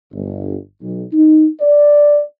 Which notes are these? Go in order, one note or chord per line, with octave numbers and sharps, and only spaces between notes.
G1
B1
D#4
D5